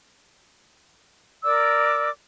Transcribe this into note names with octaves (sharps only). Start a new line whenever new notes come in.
A#4 D5 D6 E6